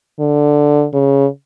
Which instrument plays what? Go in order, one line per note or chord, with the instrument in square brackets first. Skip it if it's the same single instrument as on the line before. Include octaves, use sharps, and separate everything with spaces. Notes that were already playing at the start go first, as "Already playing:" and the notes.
[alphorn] D3
C#3